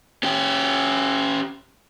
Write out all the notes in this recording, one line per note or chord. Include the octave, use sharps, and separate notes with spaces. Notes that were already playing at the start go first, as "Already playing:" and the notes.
C#4 G4